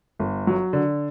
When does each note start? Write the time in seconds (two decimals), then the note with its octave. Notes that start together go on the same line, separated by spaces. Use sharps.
0.19 G1
0.47 F#3
0.73 D3